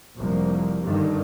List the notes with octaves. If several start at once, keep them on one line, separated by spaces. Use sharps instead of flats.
F1 C2 F3 A#3
G2 D3 D#3